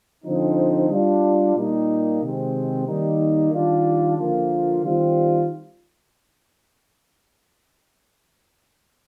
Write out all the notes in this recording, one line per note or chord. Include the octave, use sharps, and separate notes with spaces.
D3 F3 C4 D#4
G3 D4 F4
A#2 G3 A#3 D#4
C3 D#3 G#3 C4
D#3 G3 A#3 D#4
D#3 G3 D4 F4
D3 F3 A#3 F4
D#3 G3 C4 F4